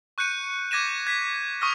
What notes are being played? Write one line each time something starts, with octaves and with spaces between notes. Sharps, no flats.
C#6 F#6 G6 C#7 D#7
D6 G#6 A#6 B6 D#7 E7
G#6 B6
C#6 D#6 F6 A#6